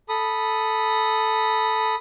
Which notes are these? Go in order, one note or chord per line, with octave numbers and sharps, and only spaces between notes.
A4 B5 D#6